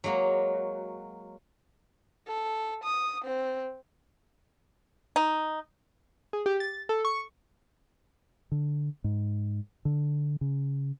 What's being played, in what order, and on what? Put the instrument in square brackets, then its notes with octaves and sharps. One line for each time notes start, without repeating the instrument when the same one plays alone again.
[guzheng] F#3 G#3 A#3 F#4
[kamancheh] A4
D#6
C4
[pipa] D#4
[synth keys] G#4
G4
A6
A4
C#6
[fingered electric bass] D3
G#2
D3
C#3